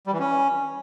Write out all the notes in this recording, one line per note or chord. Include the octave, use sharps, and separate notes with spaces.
G3
E3
C#4